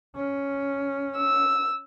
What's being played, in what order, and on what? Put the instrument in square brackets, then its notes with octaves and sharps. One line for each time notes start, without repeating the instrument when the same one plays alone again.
[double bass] C#4
[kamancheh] E6